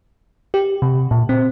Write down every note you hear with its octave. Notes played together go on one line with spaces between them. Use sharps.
G4
C3
A#2
C4